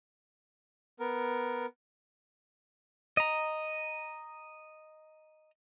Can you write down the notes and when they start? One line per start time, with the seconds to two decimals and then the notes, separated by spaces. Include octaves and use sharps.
1.00 B3 A#4
3.17 D#5 A#5